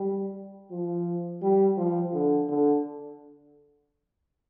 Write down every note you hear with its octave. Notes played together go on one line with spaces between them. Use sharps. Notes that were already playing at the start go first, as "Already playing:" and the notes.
Already playing: G3
F3
G3
F3
D3
D3